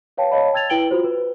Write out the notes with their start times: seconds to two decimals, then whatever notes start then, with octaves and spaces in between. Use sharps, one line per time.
0.17 B4 C#5 F5 G5 A5
0.31 C#5 D#5 F5 A5 B5
0.53 G5 A5 E6 G#6 A6 F7
0.70 E4 B4 G5 D7 F#7 G7
0.91 F4 F#4 C5
1.04 B4